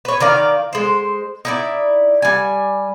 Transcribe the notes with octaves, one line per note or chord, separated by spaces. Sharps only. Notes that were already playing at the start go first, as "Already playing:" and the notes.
B4 C#5
D#3 A#4 D5 F5
G#3 C5
D#4 E4 D5
G3 G#5